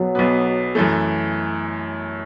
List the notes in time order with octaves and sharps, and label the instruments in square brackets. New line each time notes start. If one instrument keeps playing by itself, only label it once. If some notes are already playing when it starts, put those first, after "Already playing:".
Already playing: [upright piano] B1 B2 B3 [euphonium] F#3
[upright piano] B1 B2 B3
F#2 E3 A3